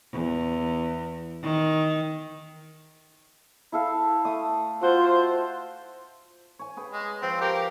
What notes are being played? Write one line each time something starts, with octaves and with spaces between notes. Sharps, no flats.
E2
D#3
E4 A4 F5
A3 D#6
F4 F#4 C5
C#5 G#5
G#4 B4 G5
G#3
F3 C4
G4 A#4